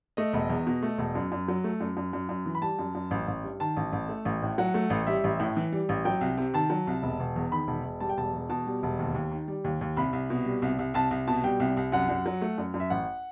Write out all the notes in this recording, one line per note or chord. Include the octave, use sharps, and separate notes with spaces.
A3 D#5
E1
E2
B2
A3
E1
F#2
F#2
F#3
A3
F#2
F#2
F#2
F#2
E3
B5
G3 A5
F#2
F#2
A1
A1
G2
D#3 A5
A1
A1
A3
A1
A2
F#3 F#5
A3
A1
G3 E5
A1
A2
E3
G3
A1
F#3 G5
C2
C3
D#3 A5
F#3
C2
E1
E1
E2
D#3 B5
E1
E1
G3 A5
G5
E1 A5
E2
B2 A5
G3
E1
D#2
D#2
D#3
G3
D#2
D#2
C2 B5
C2
B2
G3
C2
C2
C2 A5
C2
B2 A5
G3 G5
C2
C2
F#2 F#5
F#2
F#3
A3
F#2
F#2
E5
A1 F#5